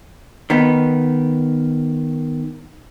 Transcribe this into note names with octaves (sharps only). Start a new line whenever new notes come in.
D#3 B3